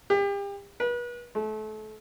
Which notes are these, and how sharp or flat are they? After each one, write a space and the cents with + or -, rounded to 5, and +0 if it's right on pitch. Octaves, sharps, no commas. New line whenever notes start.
G4 +35
B4 -35
A3 -30